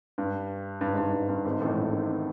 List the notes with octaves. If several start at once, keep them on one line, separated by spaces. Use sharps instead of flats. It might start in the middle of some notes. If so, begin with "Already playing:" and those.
G2
G2
G#2
G2
G#2
G2
G2
G#1 G#2
A1 A2
A1 A2
G#1 G#2